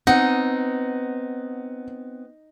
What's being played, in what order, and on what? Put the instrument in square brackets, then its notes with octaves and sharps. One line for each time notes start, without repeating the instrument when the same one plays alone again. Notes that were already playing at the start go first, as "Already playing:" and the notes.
[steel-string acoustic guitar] B3 C4 [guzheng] D#4 [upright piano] F#5